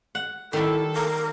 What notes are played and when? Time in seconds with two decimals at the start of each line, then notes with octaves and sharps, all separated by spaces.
0.15 F#5
0.53 D#3 F#3 G3 E4 A4
0.93 A#4